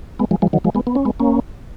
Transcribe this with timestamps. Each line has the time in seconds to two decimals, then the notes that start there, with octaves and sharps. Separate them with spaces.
0.19 G#3 B3
0.31 F3 G#3
0.42 F3 G#3
0.53 D#3 F#3
0.65 F3 G#3
0.75 G#3 B3
0.87 B3
0.95 C#4
1.05 G#3 B3
1.20 A#3 C#4